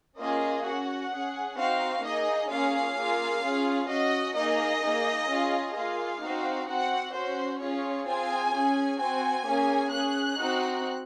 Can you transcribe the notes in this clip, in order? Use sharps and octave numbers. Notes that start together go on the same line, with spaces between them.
A#3 C#4 F4 G#4 D#5
C#4 F#4 F#5
C#4 G#4
C4 D#4 F#4 F5
A#3 D#4 G#4 D#5
A#3 C#4 F4 G#4 F5
A#3 F4 G#4
C#4 F4 G#4
C#4 F#4 D#5
A#3 D#4 G#4 D#5
A#3 D#4 G#4
C#4 F4 G#4
A#3 F4 G#4 F5
C4 D#4 F#4
C4 F#4 F#5
C#4 F#4 C5
C#4 F4 G#4 C#5
C4 F4 G#4 G#5
C#4 G#4
C4 F#4 G#5
A#3 C#4 G#4
C#4 G#4 F#6
C4 D#4 F#4